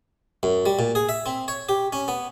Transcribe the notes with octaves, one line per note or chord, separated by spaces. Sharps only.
F#2
G3
A#2
G#4
E5
C4
C#5
G4
C#4
B3